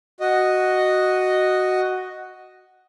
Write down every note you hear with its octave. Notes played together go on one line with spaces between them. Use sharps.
F#4 D#5